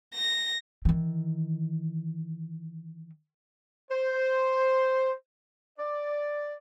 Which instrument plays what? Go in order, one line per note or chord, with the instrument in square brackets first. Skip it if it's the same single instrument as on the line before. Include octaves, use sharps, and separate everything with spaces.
[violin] A#6
[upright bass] D#3 E3
[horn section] C5
D5